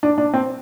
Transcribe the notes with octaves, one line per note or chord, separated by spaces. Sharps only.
D4
D4
C4